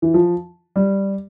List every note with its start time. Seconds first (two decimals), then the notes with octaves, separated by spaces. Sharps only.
0.02 E3
0.14 F3
0.76 G3